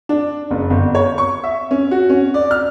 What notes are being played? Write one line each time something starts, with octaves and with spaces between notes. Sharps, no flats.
D4
F#1
G1
C#5
C#6
E5
C#4
F#4
C#4
D5
F6